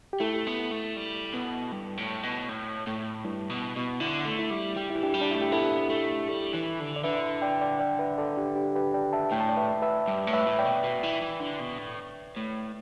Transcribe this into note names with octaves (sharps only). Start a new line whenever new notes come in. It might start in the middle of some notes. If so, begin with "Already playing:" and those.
G4
A3 E4 A4
B3
A3
G3
B2
G2
A2
B2
A2
A2
G2 E4
B2
B2
D3 E4
A3
E4
G3
G3 G4
E3 E4
D4 G4
G3
D4
A3 E4
G4
B3 E4 A4
A3
G3
E3
D3
D5
D3 B4 E5
D5 G5
D5 G5
D5 G5
B4 E5
A4 D5
D4 G4
D4 G4
G4 B4
D5 G5
E5 A5
A2 G5
A5
D5 G5
B4 E5
B4 E5
G2
A2
B4 E5
A2
D5 G5
B2
B2
E3
E3
D3
B2
A2
A2